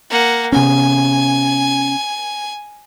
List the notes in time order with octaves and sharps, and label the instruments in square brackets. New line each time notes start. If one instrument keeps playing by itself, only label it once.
[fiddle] A#3 F#5
[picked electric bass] C3 B3 C#4 [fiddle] G#5